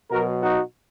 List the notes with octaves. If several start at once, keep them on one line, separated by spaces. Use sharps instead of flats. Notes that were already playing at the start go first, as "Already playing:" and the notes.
B2 F#3 F#4 A#4
D#4 F#4